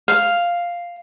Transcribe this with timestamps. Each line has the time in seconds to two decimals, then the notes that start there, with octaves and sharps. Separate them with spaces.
0.08 F5